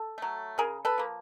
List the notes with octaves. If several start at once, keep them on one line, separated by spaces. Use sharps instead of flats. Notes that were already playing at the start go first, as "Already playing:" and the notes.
Already playing: A4
F#3 A3
C#3 G#4 A#4
A4 B4
F3 A#3